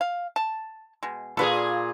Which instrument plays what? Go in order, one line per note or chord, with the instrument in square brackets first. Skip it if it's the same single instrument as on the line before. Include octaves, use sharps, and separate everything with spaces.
[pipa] F5
A5
B2 G#3
[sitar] A#2 F4 G#4 [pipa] A4 B4 D5